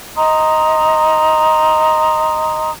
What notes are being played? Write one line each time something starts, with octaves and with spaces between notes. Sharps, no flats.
D#5 A#5 C6 D#6